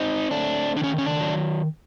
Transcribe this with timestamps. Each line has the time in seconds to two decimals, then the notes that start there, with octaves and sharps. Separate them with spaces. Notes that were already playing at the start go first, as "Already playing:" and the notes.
Already playing: C4 D#4
0.31 A3 D4
0.76 D#3 D4
0.84 C#4
0.98 C#4
1.06 D4
1.20 F#3